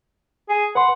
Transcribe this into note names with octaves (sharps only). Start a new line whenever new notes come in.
G#4
B4 F#5 C6